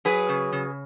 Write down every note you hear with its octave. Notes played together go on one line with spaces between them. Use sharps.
F#3 G#4 B4
C#3
C#3